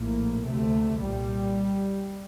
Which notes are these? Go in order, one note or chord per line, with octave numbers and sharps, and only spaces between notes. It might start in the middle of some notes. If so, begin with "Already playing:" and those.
Already playing: A#1 A2 A#3
D2 C3 A3
C2 A#2 G3